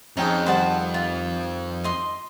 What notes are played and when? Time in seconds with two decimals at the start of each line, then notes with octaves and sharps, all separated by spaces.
0.17 F2 C#4 D#4 G#4 G5
0.46 D#3 G3 C5 F#5 A5
0.94 F4
1.84 D#5 C6